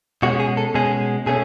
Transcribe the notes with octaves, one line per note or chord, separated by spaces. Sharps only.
B2 G#3 C#4 F#4
G#4
A4
B2 G#3 C#4 G#4
B2 A3 C#4 G#4